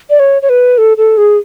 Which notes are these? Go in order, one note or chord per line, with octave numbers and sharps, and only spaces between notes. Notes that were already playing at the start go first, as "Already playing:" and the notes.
D5
C#5
C#5
B4
A4
A4
G#4